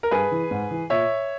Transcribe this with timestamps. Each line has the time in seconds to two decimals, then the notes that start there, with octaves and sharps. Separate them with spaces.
0.03 A#4
0.11 G2 G#4 B4
0.31 E3
0.51 G#2
0.71 E3
0.90 A#2 C#5 E5